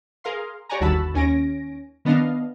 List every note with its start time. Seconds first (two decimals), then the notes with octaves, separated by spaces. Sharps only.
0.24 G#4 A#4 F5 C6
0.69 G4 C#5 D5 F#5 G#5 A#5
0.80 G1 D#2 F#4 A5 B5 E6
1.14 D#2 C#4 G#5 A#6 D7
2.05 D#3 B3 D4 D#5 F5